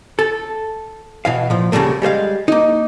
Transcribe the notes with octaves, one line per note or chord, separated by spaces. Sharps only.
A4
B2 E3 F5
A#2 F3
D2 C#3 E3 G3 A3 A#3
G3 G#3 C5 F5
A#3 D#4